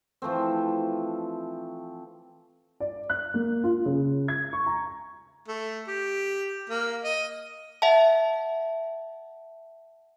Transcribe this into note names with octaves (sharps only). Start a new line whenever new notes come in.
E3 F3 A3 C4
D5
F#6
A#3
F4
C#3
G#6
C#6
A#5
A3
G4
A#3
D#5
E5 F#5 A5